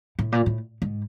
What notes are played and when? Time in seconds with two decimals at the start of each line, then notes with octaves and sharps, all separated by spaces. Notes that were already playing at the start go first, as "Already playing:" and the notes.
0.19 A2
0.32 A#2
0.46 A2
0.82 G#2